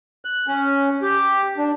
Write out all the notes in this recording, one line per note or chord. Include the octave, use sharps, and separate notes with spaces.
F#6
C#4
G4
D4